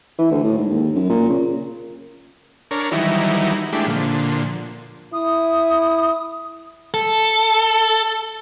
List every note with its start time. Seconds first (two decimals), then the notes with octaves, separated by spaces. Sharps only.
0.18 E3
0.31 D2
0.44 A2
0.58 G#2
0.71 D#2
0.95 F#2
1.10 A#2
1.29 C#3
2.71 D4 A#4 C#5
2.92 D#3 E3 F#3 G3 D#4 E4
3.73 G#3 A3 D4 E4 G4
3.86 A#2 D3 F3
5.13 E4 D#6
6.94 A4